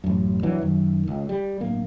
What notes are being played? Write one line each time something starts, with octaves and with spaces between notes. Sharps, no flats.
A1 F#2
G1 E3 F#3 D4
F#2 D#3
C#2
G3
D1 G1 A#3